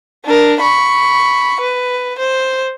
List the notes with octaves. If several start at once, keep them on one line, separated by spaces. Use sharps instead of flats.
D4 A#4
B5 C#6
B4
C5